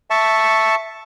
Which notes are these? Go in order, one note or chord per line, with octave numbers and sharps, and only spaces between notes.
E5 A5 C#6